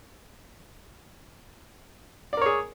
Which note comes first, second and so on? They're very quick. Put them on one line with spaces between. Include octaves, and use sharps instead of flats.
D5 A#4 C#5 G#4